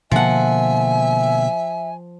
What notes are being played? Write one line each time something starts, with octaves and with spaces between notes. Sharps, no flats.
B2 D3 F3 A#3 E5 F#5 G#5